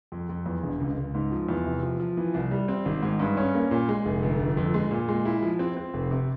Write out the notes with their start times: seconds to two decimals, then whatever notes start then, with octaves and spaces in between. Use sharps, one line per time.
0.12 F2
0.29 F2
0.46 E2
0.63 E1
0.80 C#2
0.97 C#2
1.14 G#2
1.32 F3
1.49 E2
1.66 C3
1.83 F3
2.00 F3
2.17 E3
2.34 C2
2.51 G3
2.68 C4
2.85 G#1
3.02 G#2
3.20 G2
3.37 C#4
3.54 A#3
3.71 A#2
3.89 G#3
4.05 F1
4.23 G1
4.40 G1
4.57 F2
4.74 G#3
4.91 A#2
5.08 G#3
5.25 E4
5.42 F3
5.59 C4
5.77 C4
5.94 F1
6.11 C3